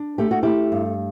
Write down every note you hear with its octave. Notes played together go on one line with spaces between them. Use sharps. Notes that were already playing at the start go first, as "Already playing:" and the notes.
Already playing: D4
A3 G4
F#4
A3 E4 G4
G2